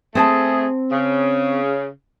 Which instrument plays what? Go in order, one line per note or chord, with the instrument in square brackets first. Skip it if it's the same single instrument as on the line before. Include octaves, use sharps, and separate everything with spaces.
[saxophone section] A3 G#4 [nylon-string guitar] C4 C5 A5
[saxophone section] C#3